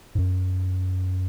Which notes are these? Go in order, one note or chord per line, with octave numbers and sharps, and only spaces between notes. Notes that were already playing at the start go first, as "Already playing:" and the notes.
G#2
F#2